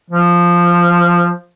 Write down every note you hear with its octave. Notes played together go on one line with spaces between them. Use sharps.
F3